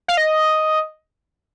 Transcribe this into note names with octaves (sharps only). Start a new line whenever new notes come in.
F5
D#5